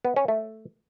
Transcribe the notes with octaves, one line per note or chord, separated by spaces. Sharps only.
B3
C#4
A3